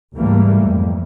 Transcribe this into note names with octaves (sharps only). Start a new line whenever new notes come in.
C#2 G#2 E3 G3 A3 A#3
F2